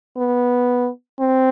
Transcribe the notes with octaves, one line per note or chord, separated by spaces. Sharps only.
B3
C4